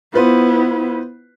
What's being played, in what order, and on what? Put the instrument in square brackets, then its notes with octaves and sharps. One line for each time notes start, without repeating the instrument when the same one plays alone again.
[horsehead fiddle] B3 E4 [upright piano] F4 B4 C5